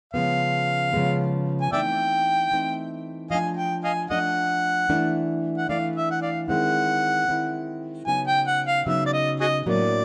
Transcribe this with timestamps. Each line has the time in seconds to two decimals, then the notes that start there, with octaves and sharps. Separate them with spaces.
0.13 C#3 F3 G#3 B3 F5
0.93 C#3 F3 G#3 B3
1.61 G#5
1.71 E3 A3 C4 D#4 D5 E5 G5
2.51 E3 A3 C4 D#4
3.31 F3 A3 D4 D#5 F5 G#5
3.57 G5
3.84 D#5 F5 G#5
4.10 F3 A3 D4 D#5 F#5
4.90 E3 A3 D4
5.58 F#5
5.69 E3 A3 D4 D5 F5
5.96 E5
6.11 F#5
6.22 D5 F5
6.48 D#3 G#3 C4 E4 F#5
7.28 D#3 G#3 C4 E4
8.07 C#3 F#3 B3 D#4 G#5
8.27 G5
8.47 F#5
8.67 F5
8.86 C#3 F#3 B3 D#4 E5
9.06 D5
9.13 D#5
9.40 F#4 G#4 D#5
9.66 A2 F#3 A#3 D4 D5